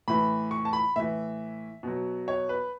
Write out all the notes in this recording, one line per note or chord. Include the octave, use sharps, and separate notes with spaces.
A2 E3 B5
C#6
A5
B5
A2 E3 E5
B2 F#3
C#5
B4